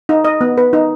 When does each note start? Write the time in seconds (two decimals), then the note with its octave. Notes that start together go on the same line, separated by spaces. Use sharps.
0.09 D#4
0.25 D#5
0.41 B3
0.58 B4
0.73 D#4